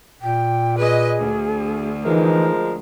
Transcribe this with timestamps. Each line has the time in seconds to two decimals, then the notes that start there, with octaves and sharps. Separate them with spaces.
0.21 A#2 G5
0.78 G#4 B4 D#5
1.18 D2
2.05 E3 F3 G#3 D#4 A#4